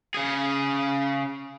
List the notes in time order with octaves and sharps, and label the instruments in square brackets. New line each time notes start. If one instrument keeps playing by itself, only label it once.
[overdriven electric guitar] C#3 G#4